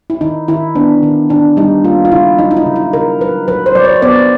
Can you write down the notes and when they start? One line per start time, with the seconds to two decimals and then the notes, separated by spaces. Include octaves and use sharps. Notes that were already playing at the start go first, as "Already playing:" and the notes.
0.10 E4
0.21 D#3 D#4
0.48 D#3 E4
0.75 B3 D4
1.03 D#3
1.29 D#3 D4
1.57 G3 D#4
1.84 A#3 F4
2.05 F4
2.12 C#3 E4
2.39 F#3 D#4
2.51 D#4
2.57 E4
2.66 C#3
2.76 E4
2.93 C#3 A#4
3.21 F#3 B4
3.48 F#3 B4
3.66 C5
3.75 F#3 D5
3.84 C#5
3.96 C#5
4.02 B3 D5